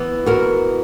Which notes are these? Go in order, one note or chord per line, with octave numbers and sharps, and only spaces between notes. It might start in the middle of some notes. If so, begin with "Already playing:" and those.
Already playing: E3 B3
F#4 A#4